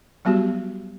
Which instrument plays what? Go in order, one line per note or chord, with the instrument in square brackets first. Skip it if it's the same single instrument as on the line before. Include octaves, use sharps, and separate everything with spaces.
[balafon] F#3 G3 B3 F#4 G4